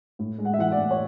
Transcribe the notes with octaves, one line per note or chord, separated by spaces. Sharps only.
A2
G#3
F#5
E5
E3 F#5
D5
A2
C#5